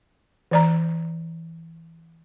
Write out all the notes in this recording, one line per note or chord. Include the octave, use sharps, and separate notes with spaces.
E3 D5 A#5